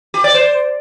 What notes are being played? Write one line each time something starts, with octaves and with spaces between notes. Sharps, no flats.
G4
D5
C5